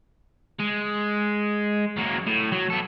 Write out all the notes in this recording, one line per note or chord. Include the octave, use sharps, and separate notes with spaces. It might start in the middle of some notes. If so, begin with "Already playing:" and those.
G#3
F#3 A#3
A2
F#3
B3 A4